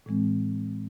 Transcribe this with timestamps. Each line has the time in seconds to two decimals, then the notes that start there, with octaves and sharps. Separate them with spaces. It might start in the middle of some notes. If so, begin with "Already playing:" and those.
0.06 A2 E3 G#3 C4